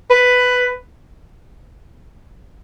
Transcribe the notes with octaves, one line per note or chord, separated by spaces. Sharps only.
B4